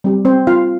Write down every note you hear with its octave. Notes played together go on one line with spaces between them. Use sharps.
G3 C4 G4
C4 C5
F4 F5